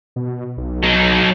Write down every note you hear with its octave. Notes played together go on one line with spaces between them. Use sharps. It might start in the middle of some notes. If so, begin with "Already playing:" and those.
B2
B1
F#3 D#4